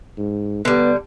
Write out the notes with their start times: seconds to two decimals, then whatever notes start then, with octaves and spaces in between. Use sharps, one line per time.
0.18 G#2
0.65 D3 G3 B3